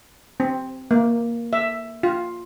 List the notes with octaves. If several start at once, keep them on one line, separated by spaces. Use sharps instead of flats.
C4
A#3
E5
F4